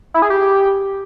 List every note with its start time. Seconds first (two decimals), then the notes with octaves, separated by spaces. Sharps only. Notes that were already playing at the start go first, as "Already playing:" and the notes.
0.14 E4
0.22 G#4
0.30 G4